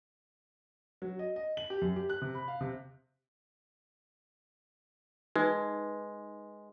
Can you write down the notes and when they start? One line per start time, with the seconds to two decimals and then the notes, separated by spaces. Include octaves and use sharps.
1.02 F#3
1.19 D#5
1.36 D#5
1.57 F#7
1.70 G4
1.82 F#2
1.96 G4
2.10 F#6
2.22 C3
2.35 B5
2.48 F5
2.61 C3
5.36 G#3 D#4 B4